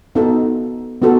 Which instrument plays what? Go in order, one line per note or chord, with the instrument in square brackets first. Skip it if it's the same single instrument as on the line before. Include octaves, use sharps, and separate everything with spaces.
[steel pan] B3 D#4 F#4 A4
B3 D#4 F#4 A4